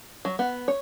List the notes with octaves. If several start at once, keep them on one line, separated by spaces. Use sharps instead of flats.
F#3
B3
C#5